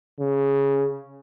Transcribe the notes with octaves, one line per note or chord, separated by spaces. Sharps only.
C#3